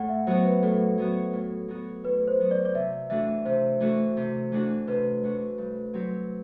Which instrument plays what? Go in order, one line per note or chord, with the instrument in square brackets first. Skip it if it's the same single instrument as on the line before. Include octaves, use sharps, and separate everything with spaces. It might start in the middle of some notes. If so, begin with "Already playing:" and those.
Already playing: [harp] A2 [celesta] F#5
[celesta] E5
[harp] F#3 B3 F#4 [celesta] C5
[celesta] B4
[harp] A2 [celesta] A4
[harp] F#3 B3 F#4
A2
F#3 B3 F#4
[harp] A2 [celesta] B4
[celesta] C5
[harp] F#3 B3 F#4
[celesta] D5
D5
[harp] C3 [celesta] E5
[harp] E3 A3 D4 F#4 [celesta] E5
[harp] C3 [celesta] C5
[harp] E3 A3 D4 F#4
C3
E3 A3 D4 F#4
[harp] C3 [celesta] B4
[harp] E3 A3 D4 F#4
G2
F#3 C4 G4